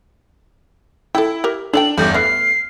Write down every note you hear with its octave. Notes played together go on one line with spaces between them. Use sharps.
E4 A4 G5
G4 A#4
D4 A4 D5 G5 F#7
G1 E2 G3 A3 G6
A3 B3 E4 F6 C7